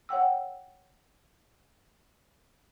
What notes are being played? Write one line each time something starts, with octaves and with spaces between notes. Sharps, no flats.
C#5 F#5 G5 E6